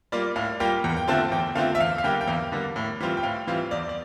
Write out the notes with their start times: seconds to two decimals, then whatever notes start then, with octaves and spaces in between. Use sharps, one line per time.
0.12 G3 A#3 F4 D5
0.36 A2 F5
0.60 G3 A#3 F4 G5
0.84 E2
0.97 G5
1.08 D3 A3 C4 F4 A5
1.32 E2 G5
1.55 D3 A3 C4 F4 F5
1.75 E5
1.80 E2 F5
1.98 F5
2.04 D3 G3 A#3 G5
2.21 G5
2.28 E2 F5
2.52 D3 G3 A#3
2.76 A2
3.00 E3 G3 C4 F4
3.17 G5
3.23 A2 F5
3.47 E3 G3 C4 F4 F5
3.71 E2 D5
3.89 D5